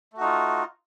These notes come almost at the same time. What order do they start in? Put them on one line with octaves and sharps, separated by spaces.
A3 F#4 D#4 F4